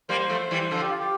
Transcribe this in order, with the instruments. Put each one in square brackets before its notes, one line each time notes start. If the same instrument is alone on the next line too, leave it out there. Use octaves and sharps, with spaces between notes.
[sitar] G3 A#3 [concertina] C5
[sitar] F3 A3
E3 G3
[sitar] D3 F3 [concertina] A4
[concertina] G4
F4
G4